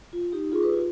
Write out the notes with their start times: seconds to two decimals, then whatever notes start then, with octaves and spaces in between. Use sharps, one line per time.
0.13 F4
0.33 D#4 G4
0.52 F4 G#4
0.62 G4 B4
0.73 F4